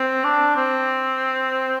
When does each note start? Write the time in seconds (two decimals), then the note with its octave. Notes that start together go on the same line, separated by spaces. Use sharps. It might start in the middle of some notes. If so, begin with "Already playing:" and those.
Already playing: C4
0.24 D4
0.56 C4